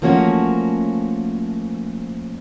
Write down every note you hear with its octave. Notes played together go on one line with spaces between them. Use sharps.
F3 A3 A#3 C#4 F#4 C#5